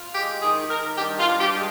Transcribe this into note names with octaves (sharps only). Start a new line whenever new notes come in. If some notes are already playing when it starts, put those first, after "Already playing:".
Already playing: F4
G#3 G4
D#3 G#4
D#3 A#4
G2 G4
F4
G2
G4
G#3